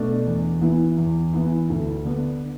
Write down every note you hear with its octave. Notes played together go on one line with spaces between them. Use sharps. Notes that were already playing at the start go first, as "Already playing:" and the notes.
Already playing: B2 A3 D4
E2
E3 B3 E4
E2
E3 B3 E4
D2
D3 B3 D4